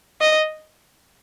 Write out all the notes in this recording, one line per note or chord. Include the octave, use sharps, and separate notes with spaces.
D#5